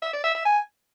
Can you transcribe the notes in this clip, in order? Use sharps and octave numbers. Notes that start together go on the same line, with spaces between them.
E5
D5
E5
E5
G#5